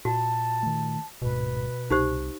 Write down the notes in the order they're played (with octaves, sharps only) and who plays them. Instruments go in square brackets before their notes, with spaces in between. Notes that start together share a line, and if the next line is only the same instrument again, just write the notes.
[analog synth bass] A#2 [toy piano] F#4 [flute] A5
[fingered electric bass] D#3 A3
[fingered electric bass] D1 G#2 [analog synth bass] B2 [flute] B4
[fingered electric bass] C2 [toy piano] D#4 G4 C5